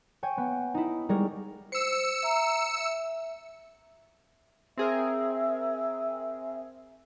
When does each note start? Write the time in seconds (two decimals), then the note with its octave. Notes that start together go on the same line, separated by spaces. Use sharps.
0.23 C#5 G5 G#5
0.37 B3
0.74 D#4 E4
1.09 G3 G#3 A#4 C#5
1.72 C5 E6 C#7
2.23 E5 A#5
2.78 E5
4.77 C4 G#4 A#4 E5